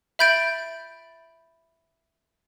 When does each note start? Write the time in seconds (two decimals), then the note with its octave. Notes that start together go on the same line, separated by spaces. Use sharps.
0.19 E5 B5 G6 A6 D7